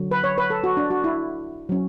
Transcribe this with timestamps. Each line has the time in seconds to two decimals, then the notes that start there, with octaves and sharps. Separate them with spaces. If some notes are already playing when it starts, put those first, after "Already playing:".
Already playing: D3 F#3
0.11 B4
0.24 C#5
0.38 B4
0.50 A4
0.64 F#4
0.77 D4
0.91 F#4
1.04 E4
1.69 F#3 C#4